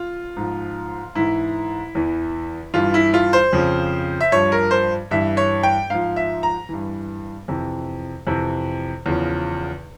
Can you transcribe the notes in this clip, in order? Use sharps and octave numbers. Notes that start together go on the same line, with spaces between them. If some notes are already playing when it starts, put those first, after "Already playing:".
Already playing: F4
G#2 F3
G#2 E3 E4
E2 E3
G2 E3 F4
E4
F4
C5
F2 C#3 F3
E5
G2 F3 C#5
A#4
C5
G2 E3 E5
C#5
G5
G#2 F3 F5
E5
A#5
G2 E3
F2 C3 E3
F2 C3 E3
E2 C#3 F3